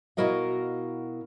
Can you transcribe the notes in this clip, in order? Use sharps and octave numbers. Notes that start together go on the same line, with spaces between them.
B2 E4 F#4 A#4 D#5 F5